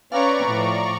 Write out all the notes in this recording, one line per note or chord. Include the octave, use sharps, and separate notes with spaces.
C#4 B4 D5 F5 A#5 C#6
A2 F3